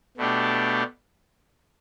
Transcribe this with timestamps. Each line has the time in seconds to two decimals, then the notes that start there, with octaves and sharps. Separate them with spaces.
0.17 B2 A3 D4 G4